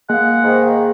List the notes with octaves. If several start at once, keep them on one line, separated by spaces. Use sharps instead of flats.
G#3 A#3 F5 F#5
G#2 D#3